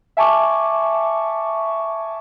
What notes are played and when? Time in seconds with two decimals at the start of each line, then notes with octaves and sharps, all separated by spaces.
0.17 E5 G#5 A5 C#6 D6